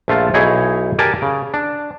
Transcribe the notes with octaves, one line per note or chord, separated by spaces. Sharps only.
A#1 A3 F4 A5
B1 D#4 E4 G#4 C#5
G4 A#4 D5 G#5 A5
C#3
D4